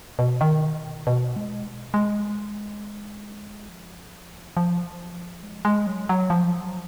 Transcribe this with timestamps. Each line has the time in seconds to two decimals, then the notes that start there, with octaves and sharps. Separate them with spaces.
0.19 B2
0.41 D#3
1.07 B2
1.36 G#3
1.94 G#3
3.69 F3
4.57 F3
5.43 G#3
5.65 G#3
5.87 F#3
6.09 F#3
6.30 F3